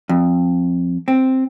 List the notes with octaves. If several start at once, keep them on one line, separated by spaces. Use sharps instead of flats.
F2
C4